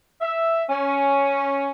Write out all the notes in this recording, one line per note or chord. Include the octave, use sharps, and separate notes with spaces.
E5
C#4